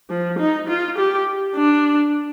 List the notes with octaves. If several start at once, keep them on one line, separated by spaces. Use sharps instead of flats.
F3
D#4
F4
G4
D4